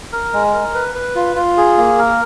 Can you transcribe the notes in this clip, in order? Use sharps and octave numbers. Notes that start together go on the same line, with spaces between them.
A#4
G#3
A#4
B4
B4
F4
F4
G#4
A#3
A#4